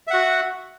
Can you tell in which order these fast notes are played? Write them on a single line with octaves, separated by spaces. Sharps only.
E5 F#5 F#4